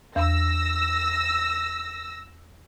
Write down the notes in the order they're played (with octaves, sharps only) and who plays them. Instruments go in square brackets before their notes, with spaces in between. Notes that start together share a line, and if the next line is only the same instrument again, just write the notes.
[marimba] E2 [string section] E6 A#6